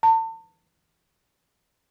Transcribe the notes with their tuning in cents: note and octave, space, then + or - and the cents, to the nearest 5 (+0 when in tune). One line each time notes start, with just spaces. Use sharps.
A5 +40